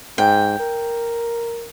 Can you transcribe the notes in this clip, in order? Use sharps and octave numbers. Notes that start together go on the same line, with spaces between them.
G#2 G5
A#4